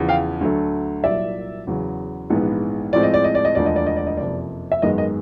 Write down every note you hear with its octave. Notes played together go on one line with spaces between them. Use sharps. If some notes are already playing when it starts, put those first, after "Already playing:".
Already playing: E2 C#3 F3
F5 G5
D2 D3 F#3 A3
C2 A#2 F#3 D5 E5
E2 C#3 F#3
A#1 G#2 E3 G#3 B3
A2 F3 G#3 C4 D5
D#5
D5
D#5
D5
D#5
E1 D2 D3 F3 D5
D#5
D5
D#5
D5
D#5
F#1 F2 C3 D5
E5
G#1 F#2 D#3 G#3 B3 D#5
D#5